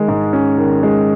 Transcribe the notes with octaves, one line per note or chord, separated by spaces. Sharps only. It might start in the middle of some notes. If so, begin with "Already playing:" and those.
Already playing: D#3 G#3
G#2
C#4
D#3
G#3